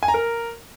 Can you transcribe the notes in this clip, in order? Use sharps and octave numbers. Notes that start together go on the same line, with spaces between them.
G#5
A#5
A#4